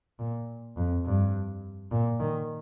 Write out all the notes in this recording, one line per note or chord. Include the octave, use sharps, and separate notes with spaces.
A#2
F2
G2
A#2
D#3